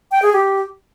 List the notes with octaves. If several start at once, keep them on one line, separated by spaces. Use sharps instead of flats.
G5
G#4
G4